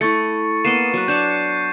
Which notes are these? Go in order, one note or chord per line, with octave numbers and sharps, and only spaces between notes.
A3 E4 C#6 A6 C#7
A#3 B3 D#5 C7 D#7 E7
F#3 B4
D4 C#5 G6 E7